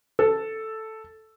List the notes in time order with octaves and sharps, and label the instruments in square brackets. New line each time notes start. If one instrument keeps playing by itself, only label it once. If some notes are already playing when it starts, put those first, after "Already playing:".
[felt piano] A4